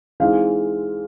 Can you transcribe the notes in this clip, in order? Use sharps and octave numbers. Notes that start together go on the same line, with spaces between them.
E3 G#3 C4 D#4 F5